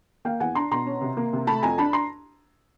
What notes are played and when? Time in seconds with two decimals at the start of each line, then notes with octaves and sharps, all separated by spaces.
0.25 A#3 F5 G5
0.40 E2 F#5 G#5
0.55 D4 A#5 C6
0.71 B2 A#5 C6
0.87 C#4
1.01 C3
1.17 A#3
1.33 C3
1.47 A3 A5 B5
1.63 F2 G#5 A#5
1.78 D4 A5 B5
1.93 A#5 C6